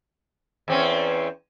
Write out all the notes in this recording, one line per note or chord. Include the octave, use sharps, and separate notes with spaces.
E2 C4 C#4